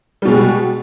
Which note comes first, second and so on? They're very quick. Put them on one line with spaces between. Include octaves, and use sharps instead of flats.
G3 B2 G#3